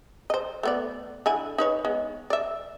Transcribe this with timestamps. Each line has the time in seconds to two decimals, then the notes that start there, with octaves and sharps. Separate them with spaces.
0.30 C5 D#5
0.63 A3 B3 D5
1.26 D3 E4 G#5
1.58 D#4 B4 C#5
1.85 G#3 B3
2.30 D5 E5